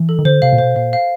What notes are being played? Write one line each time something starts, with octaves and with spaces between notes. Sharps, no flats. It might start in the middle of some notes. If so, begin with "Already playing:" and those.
Already playing: E3
A4
D#3
D3 C5
C3 F5
A#2
B2 C5
A#2 F5
F5